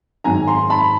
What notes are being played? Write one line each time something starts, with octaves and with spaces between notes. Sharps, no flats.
G#2 D#3 F#3 G#5 A#5
A#5 C6
A5 B5